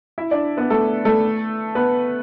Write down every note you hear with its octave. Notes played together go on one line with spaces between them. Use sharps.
E4 E5
D4 D5
B3 B4
A3 A4
A3 A4
B3 B4